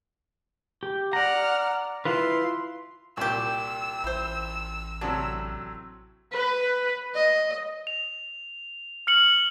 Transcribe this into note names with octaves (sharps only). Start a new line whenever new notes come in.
G4
D5 F#5 A#5 F6
E4 F4 B4 C6
C2 A#2 F#4 G4 E6
A1 E4 C5
A2 C3 F#3 D4
B4
D#5
F7
F6 C#7 F#7